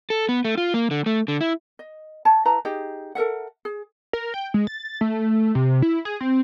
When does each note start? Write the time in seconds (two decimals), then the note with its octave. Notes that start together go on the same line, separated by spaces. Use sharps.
0.10 A4
0.29 B3
0.45 A3
0.58 F4
0.74 A#3
0.91 D3
1.06 A3
1.28 D3
1.41 E4
1.79 D#5
2.25 C#5 F5 A5
2.45 E4 B4 A5 A#5
2.65 D#4 G4 G#4 D#5
3.15 A4 A#4 E5 F#5
3.65 G#4
4.13 A#4
4.34 G5
4.54 G#3
4.67 A6
5.01 A3
5.55 C3
5.82 E4
6.05 G#4
6.21 C4